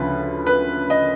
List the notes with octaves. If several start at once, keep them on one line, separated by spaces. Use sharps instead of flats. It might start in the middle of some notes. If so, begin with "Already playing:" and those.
Already playing: D2 C#3 F3 B4
B4
D#5